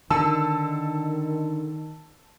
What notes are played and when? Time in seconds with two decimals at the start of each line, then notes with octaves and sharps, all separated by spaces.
0.11 D3 D#3 A5 E6